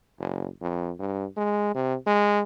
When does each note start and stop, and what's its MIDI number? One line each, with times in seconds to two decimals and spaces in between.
0.20 0.47 30
0.61 0.92 41
1.00 1.25 43
1.37 1.73 56
1.75 1.94 48
2.07 2.42 56